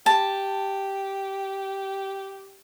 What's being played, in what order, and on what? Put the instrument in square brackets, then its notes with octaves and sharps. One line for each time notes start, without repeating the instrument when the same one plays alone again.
[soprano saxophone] G4 [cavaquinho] A5